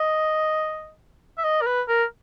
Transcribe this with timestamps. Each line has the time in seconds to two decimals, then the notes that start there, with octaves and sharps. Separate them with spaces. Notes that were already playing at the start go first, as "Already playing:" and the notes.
Already playing: D#5
1.38 E5
1.44 D#5
1.62 A#4
1.66 B4
1.88 A#4